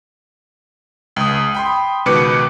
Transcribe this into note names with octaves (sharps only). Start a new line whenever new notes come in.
C#2 D#6
G5 B5 C6
C#2 B2 D#3 B4 D6 C#7